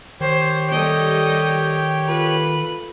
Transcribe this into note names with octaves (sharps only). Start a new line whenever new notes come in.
D#3 G4 C5 C#5
G3 A4 D#5 G5
F4 A4 B4